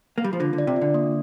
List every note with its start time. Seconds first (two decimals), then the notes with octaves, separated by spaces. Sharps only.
0.18 A#3
0.24 G3
0.33 F3
0.40 D3 F4
0.53 D3
0.58 D5
0.67 C3
0.76 F4
0.81 D3
0.94 A#3